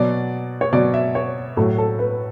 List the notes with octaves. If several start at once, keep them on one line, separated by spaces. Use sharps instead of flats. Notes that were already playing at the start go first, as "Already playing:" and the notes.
Already playing: B2 F#3 D5
C#5
B2 F#3 D5
E5
C#5
A2 F#3 A4
A4
B4